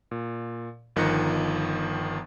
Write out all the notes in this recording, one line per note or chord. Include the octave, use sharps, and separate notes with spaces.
A#2
G1 D#3 F3 F#6 A#6 C#7